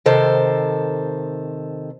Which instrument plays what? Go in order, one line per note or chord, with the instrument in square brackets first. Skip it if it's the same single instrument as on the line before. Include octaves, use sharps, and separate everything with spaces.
[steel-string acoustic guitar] C3 D#3 A4 C5